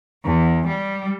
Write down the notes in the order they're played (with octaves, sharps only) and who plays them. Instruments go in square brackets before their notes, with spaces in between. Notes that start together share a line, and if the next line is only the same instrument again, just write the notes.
[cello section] E2
G3